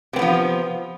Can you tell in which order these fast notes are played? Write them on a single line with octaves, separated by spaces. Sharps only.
C3 C4 B3 F3